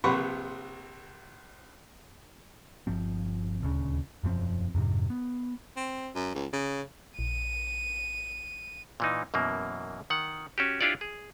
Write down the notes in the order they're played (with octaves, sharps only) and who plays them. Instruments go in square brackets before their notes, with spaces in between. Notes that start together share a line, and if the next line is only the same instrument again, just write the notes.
[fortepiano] A#1 C3 B4 F#5 C6 C#6
[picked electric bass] G1 F3 C4
D#1 D2 C#3
E1 F#2 F3 C4
F2 G#2 C3
B3
[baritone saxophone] C4
F#2
C#2
C#3
[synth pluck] A#1 [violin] D#7
[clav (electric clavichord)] A#2 E3 D#4
F#2 B2 E3 A#3
D#3 F#5
C#4 F#4 G4
D4 E4 F4 G4 C#5 D5
G#4